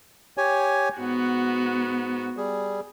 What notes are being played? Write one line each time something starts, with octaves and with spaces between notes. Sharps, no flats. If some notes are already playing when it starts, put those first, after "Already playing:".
G4 C#5 G#5
G#2 B3 F#4
G3 G#4